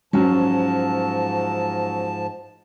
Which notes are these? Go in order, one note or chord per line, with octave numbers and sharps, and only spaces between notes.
G#2 F3 F#3 C#4 A5